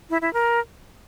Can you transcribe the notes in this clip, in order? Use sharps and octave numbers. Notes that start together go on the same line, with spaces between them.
E4
E4
A#4